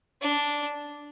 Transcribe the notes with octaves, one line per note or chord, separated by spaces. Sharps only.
D4